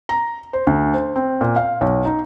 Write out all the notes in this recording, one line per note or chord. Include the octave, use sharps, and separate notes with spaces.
A#5
C5
D2
C5
C4
A#2
F5
B1
D#4